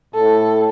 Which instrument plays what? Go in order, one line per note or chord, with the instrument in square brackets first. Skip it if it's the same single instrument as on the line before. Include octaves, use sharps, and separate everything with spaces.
[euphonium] A2 [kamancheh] A4